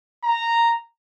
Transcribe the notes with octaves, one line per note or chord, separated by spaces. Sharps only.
A#5